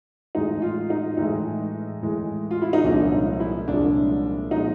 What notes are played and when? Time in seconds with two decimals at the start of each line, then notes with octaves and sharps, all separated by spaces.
0.35 A2 E3 G#3 D#4
0.62 F4
0.90 D#4
1.17 A2 E3 G#3 D#4
2.02 A2 E3 G#3
2.51 F4
2.62 E4
2.73 D#4
2.84 C2 A#2 F3 G#3 C#4 D4
3.12 D#4
3.40 E4
3.68 C2 A#2 F3 G#3 C#4 D4
4.51 A#2 F3 G#3 C#4 D#4